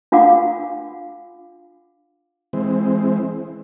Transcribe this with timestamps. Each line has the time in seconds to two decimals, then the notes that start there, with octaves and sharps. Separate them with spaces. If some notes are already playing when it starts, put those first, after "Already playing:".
0.12 D4 F4 F5 F#5 D6
2.53 E3 G#3 C4